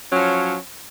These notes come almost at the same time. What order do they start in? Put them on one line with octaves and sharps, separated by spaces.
C#4 F#3 F3